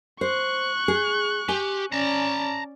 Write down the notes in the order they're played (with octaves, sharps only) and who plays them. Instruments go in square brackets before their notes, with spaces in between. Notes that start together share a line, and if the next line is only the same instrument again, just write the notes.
[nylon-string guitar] C5 [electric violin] C#6 F#6
[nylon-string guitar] G#4
[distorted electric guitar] G4 [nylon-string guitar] G#5
[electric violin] C#4 D5 [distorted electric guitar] A5 A#5